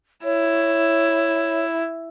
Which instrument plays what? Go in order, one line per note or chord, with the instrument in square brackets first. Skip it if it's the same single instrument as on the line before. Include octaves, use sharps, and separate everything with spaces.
[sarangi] E4 [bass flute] C#5